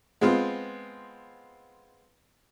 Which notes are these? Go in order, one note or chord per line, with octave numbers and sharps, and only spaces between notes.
G#3 B3 C4 F4